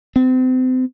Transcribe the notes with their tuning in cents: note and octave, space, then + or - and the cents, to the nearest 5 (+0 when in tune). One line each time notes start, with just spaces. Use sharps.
C4 -35